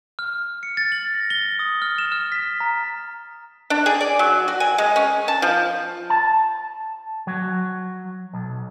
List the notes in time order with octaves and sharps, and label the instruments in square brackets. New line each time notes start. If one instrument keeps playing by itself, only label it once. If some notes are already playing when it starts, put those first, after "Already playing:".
[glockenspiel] F6
C#7
A6
F#7
A#6
G7
D#6
F6
E7
F6
B6
A#5
[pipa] D4
G#4
D5
F#3
F#4
G#5
G#3
C#4
A5
F3
[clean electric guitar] A5
F#3
B1